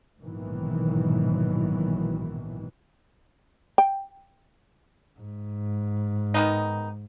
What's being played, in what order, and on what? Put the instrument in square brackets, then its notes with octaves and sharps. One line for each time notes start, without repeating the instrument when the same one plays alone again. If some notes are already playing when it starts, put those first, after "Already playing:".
[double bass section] A#1 G#2 B2 D#3 E3 F#3
[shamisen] G5
[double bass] G#2
[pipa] D#3 B3 D#4